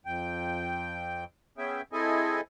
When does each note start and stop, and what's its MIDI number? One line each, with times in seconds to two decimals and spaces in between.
0.06 1.24 41
0.06 1.24 79
1.58 1.82 59
1.58 1.82 61
1.58 1.82 68
1.58 1.82 76
1.58 1.82 79
1.92 2.41 60
1.92 2.41 64
1.92 2.41 68
1.92 2.41 69
1.92 2.41 75
1.92 2.41 80